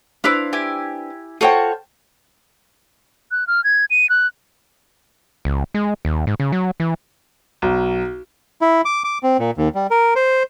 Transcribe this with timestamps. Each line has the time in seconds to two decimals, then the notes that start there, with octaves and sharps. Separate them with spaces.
0.24 D4 E4 B4 C5 F5
0.53 E4 G4 G#5
1.41 F4 F#4 A4 C5 C#5 G5
3.31 F#6
3.47 F6
3.64 G#6
3.90 D#7
4.10 F#6
5.45 C#2
5.74 G#3
6.05 D#2
6.27 G#2
6.40 C#3
6.52 F#3
6.80 E3
7.62 B1
8.61 E4
8.85 D6
9.04 D6
9.23 C4
9.39 A#2
9.58 D#2
9.75 G3
9.91 A#4
10.16 C5